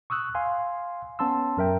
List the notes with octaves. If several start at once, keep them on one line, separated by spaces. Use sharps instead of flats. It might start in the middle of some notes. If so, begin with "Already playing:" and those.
C#6 D#6 E6 F#6
F5 G#5 C6
B3 C#4 A5 C6 E6
F#2 A#4 E5 G5